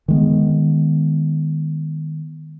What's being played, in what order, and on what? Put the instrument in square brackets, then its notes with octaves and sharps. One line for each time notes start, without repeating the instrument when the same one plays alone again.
[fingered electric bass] D#3 G#3 B3